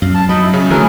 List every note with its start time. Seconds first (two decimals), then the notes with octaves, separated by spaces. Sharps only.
0.02 F#2 F5
0.14 A5
0.29 F#3 D#4 D#5 B5
0.42 E4
0.53 C#3
0.70 D3 E3 F#3 A3 G#4 A#4 B4